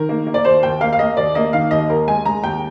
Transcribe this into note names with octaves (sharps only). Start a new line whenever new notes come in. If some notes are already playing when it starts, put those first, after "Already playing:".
Already playing: D#3 A#4
A#3
A#3
D5
D#2 C5
D#2 G5
A#3 F5
F5
A#3 D#5
D#2 D5
A#3 D#5
D#3 F5
D#2 D#5
D#2 A#4
G#3 G#5
G#3 A#5
D#2 G5